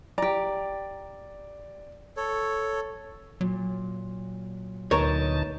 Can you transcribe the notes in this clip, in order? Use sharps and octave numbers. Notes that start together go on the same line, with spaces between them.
G4 D5 A#5
A4 C#5
A#2 F#3
D2 A#2 B3 D#4 A#4 C#5 A5